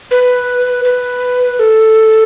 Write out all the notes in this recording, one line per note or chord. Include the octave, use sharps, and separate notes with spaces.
B4
B4
A4